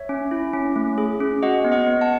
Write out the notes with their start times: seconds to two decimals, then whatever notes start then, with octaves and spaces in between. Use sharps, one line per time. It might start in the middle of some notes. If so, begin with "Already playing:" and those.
Already playing: C#5 E5
0.09 C#4
0.31 E4
0.53 C#4
0.76 A3
0.98 G#4
1.20 C#4
1.43 F#4 D#5 F#5
1.64 B3
1.72 D#5 F#5
1.87 B3
2.01 F#5 A5